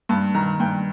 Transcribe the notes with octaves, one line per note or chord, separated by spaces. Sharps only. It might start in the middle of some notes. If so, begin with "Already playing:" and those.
G2 A5
D#3 A#5
G2 G5